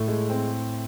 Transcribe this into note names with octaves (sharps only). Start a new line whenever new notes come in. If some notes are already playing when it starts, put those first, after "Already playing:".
Already playing: A2 A3
G#3
C4